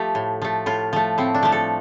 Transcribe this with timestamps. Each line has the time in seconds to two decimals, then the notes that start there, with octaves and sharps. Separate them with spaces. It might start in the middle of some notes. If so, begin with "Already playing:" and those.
Already playing: F3 A3 G4
0.15 A2
0.42 F3 A3
0.66 A2 F4
0.93 F3 A3
1.18 A2 C4
1.34 D4
1.43 F3 A3
1.52 A4